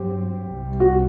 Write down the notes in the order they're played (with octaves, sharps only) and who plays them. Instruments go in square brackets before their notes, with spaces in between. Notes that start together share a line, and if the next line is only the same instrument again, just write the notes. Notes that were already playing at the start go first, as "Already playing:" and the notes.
Already playing: [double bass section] G2 F#3 C4 [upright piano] G4
[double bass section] C2 C3 G3
[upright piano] F#4